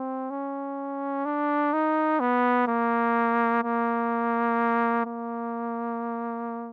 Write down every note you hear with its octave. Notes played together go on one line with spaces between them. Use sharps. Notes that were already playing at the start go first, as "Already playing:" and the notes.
Already playing: C4
C#4
D4
D#4
B3
A#3
A#3
A#3